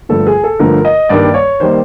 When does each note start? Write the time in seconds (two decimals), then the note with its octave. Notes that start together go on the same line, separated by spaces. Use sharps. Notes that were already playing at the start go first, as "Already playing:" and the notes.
0.09 G2 D3 F3 A3 A4
0.27 G#4
0.44 A4
0.59 G2 D3 F3 A3 A#4
0.85 D#5
1.09 G2 D#3 G3 A#3 D5
1.34 C#5
1.60 D#3 G3 A#3 C5